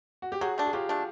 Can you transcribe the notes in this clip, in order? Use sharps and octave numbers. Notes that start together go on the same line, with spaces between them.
F#4
G4
F#3 F#4 G#4
A3 D4
G#4
F#3 F4 G4
A3 D4